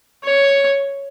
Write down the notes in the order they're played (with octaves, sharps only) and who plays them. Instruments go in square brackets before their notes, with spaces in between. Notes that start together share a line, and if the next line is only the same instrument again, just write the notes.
[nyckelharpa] C#5